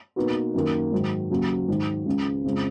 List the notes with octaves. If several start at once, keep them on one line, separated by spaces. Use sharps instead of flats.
B2 A#3 D#4 F#4 B4
F#2 D#3 A#3
G#2 D#3 F#3
D#2 C#3 F#3
G#2 D#3 F#3
C#2 C#3 G#3
F2 C#3 G#3